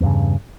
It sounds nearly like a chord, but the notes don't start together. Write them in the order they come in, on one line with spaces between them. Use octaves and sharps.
E2 G2 C#3